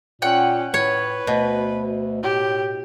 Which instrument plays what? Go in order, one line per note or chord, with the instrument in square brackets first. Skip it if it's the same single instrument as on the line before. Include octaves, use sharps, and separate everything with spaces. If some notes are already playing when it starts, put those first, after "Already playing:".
[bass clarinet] A#2 [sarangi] C#4 [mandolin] F#5 G5
[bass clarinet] A2 [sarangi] B4 [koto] C#5
[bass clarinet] D2 [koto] B2
[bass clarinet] A2 [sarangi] G4